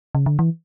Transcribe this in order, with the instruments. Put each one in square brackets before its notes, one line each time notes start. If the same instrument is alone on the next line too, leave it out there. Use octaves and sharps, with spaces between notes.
[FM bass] C#3
D3
E3